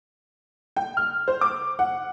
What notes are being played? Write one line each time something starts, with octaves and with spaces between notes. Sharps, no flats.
G5
F6
C5
D6
F#5